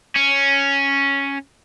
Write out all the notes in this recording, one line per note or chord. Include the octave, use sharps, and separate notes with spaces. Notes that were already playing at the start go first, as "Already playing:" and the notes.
C#4